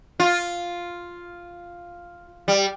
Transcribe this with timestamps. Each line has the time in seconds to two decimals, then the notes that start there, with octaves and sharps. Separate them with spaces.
0.20 F4
2.48 G3